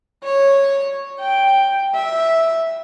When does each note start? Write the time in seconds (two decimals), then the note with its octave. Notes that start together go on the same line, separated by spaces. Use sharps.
0.24 C#5
1.20 G5
1.94 E5